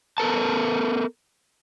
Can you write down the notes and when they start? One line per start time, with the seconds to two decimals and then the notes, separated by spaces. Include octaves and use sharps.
0.18 B3 A4 A#4 A5